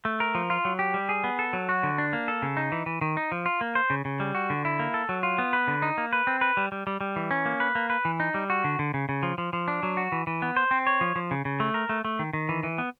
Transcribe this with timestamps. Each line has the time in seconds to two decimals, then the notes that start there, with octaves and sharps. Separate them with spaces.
0.05 A3
0.20 A#4
0.35 F3
0.50 F4
0.65 F#3
0.79 G4
0.94 G3
1.09 G#4
1.24 B3
1.39 A4
1.53 F#3
1.69 F#4
1.83 D3
1.98 D4
2.13 A#3
2.28 A4
2.42 C#3
2.57 D#4
2.72 E3
2.86 E3
3.01 D#3
3.17 D#4
3.32 F3
3.46 F4
3.61 A#3
3.75 C5
3.90 C#3
4.05 C#3
4.20 G3
4.35 F#4
4.50 D3
4.65 E4
4.79 A#3
4.94 A4
5.09 F#3
5.23 F4
5.38 B3
5.53 B4
5.68 D3
5.82 D#4
5.98 A#3
6.13 B4
6.27 C4
6.41 B4
6.57 G3
6.72 G3
6.87 G3
7.01 G3
7.16 E3
7.31 C#4
7.46 A#3
7.60 B4
7.75 A#3
7.90 B4
8.05 E3
8.20 D#4
8.34 G3
8.50 F#4
8.64 D3
8.79 D3
8.94 C#3
9.09 C#3
9.23 F3
9.38 F3
9.53 F3
9.68 D4
9.83 F#3
9.97 F#4
10.12 E3
10.27 E3
10.42 B3
10.57 C5
10.71 C4
10.87 C#5
11.01 F3
11.16 F3
11.31 C#3
11.45 C#3
11.60 A3
11.74 A#4
11.89 A3
12.05 A3
12.19 D#3
12.33 D#3
12.49 E3
12.63 E3
12.78 B3